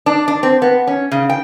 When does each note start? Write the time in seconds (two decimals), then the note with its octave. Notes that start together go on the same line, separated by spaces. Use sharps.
0.06 D4
0.28 D4
0.43 C4
0.62 B3
0.87 C#4
1.11 C#3
1.30 G5